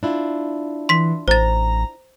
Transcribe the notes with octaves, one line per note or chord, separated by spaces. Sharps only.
D4 E4 F4
E3 C6 B6
A1 C5 A#5 A6